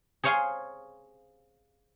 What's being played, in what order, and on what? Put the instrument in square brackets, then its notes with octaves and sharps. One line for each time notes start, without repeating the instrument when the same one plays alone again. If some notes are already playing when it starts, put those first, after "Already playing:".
[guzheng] G#4 C5 C#5 F5 G#5 C6